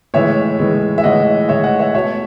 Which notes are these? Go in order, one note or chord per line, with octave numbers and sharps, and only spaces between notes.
A2 E3 G#3 C#5 E5
A2 E3 G#3
E5
A2 E3 G#3 D#5 F#5
A2 E3 G#3 C#5 E5
D#5 F#5
C#5 E5
B2 A3 C#5 E5